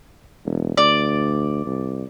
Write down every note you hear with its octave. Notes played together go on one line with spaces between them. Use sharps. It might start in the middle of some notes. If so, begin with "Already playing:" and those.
E1
D2 D5
C2